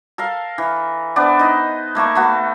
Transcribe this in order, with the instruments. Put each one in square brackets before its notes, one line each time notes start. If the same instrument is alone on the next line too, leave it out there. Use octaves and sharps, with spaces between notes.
[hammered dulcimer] A4 A#4 F5
E3
B3 D4 C5 D5
D#4 D#5
A3 A#3 A5 C#6
A3 B3 F#4